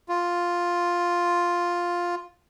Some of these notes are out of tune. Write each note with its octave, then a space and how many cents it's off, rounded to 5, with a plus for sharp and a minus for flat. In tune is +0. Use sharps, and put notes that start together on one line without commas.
F4 +5